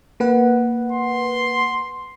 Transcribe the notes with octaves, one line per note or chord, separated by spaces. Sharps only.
A#3 B4 F#5
C6